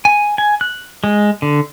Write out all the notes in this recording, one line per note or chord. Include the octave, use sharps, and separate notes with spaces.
G#5
G#5
F#6
G#3
D3